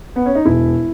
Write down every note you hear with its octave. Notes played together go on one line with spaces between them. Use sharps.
B3
C#4
D#4
E1 E4